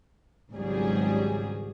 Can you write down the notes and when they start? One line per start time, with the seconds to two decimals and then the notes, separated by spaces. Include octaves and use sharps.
0.53 G#1 C#2 G#2 F#3 G3 G#4